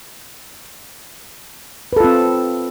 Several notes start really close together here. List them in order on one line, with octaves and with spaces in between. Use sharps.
B4 A4 F4 C4